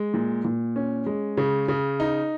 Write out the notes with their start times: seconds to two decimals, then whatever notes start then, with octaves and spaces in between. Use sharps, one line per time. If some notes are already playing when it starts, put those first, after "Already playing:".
Already playing: G#3
0.14 A#2
0.45 A#2
0.76 C#4
1.06 G#3
1.37 C#3
1.68 C#3
2.00 D#4